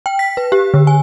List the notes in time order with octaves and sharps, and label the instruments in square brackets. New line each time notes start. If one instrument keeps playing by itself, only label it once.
[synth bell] G5
B6
B4
G4
D3
G#5